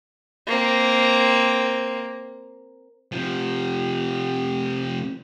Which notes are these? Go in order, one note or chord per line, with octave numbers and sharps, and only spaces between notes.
A#3 C4
C3 F3